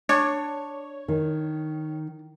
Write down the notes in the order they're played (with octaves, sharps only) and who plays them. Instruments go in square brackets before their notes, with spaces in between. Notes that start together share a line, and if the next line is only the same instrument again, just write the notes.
[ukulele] D4 [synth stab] C#5
[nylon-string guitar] D#3